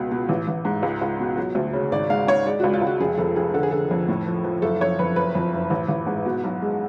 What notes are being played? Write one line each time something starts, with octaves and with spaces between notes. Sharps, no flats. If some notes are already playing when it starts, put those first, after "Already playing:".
Already playing: C#2 B2
B2
A1
A1
G#2
C#2
C#2
B2
F#3
D2
C#3
G#1 D5
G#2 F5
G#2 C#5
G#3 D5
C#2 F#4
F4
C#2
F#4
F1 G#4
F2 A4
F1 G#4
D3 A4
G#4
D3 A4
F2
A2
F3
F3
F#1 A4
F3 C#5
F2 B4
F#1 B4
F2
F#1
A1
A1
G#2
B2
B1
G#3